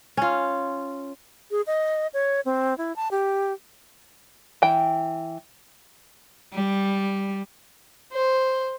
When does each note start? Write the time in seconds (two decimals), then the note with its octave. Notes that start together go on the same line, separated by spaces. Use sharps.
0.17 C#4 F4
1.51 G#4
1.67 D#5
2.14 C#5
2.45 C4
2.78 E4
2.96 A5
3.11 G4
4.62 E3 G5
6.54 G3
8.12 C5